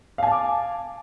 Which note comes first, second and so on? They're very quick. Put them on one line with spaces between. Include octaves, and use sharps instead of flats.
F5 G#5 A5 D6